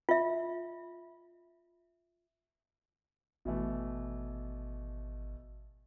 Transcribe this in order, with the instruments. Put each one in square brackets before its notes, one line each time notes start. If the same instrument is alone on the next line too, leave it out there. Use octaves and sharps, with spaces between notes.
[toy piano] F4 E5
[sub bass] G#1 [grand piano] B2 E3 A3